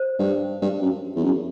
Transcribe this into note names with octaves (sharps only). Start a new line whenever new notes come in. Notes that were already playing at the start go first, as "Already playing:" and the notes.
Already playing: C5
G2
G2
F#2
E2
F#2